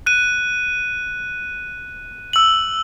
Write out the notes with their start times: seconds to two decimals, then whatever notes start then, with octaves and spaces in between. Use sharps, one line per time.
0.06 F#6 D#7
2.33 E6 F#7